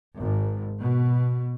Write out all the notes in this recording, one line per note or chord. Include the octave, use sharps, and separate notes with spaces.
G#1
B2